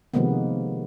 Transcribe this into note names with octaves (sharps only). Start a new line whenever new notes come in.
C3 D#3 F3 G#3 A#3 B3